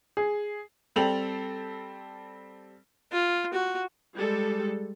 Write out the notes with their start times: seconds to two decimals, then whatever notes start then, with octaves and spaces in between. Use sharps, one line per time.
0.17 G#4
0.96 G3 C4 A4 F7 F#7
3.12 F4
3.53 F#4
4.16 G3 G#3 A4